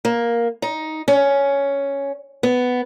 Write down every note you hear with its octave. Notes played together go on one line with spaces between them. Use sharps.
A#3
D#4
C#4
B3